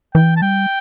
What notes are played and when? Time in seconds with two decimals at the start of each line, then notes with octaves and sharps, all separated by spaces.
0.15 E3 G5
0.37 A5
0.42 G3 G5